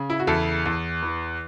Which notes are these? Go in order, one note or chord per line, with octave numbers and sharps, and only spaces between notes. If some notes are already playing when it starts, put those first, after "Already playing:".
Already playing: C#3
E4
F#4
E2 E4 A4
E2
E3